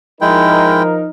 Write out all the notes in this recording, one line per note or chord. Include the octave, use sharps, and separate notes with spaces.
F3 G#3 D#4 E4 A#4 G5